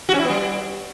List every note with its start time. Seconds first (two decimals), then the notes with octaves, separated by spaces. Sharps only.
0.09 F#4
0.14 C#4
0.19 E4
0.25 B3
0.30 G3